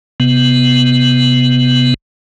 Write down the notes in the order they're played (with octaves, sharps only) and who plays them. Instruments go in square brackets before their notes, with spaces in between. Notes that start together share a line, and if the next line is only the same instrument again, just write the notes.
[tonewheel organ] C3 B3